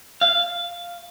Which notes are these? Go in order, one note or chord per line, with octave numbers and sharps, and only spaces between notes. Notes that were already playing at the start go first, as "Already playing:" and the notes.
F5